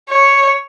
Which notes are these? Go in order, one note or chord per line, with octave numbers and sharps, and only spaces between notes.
C#5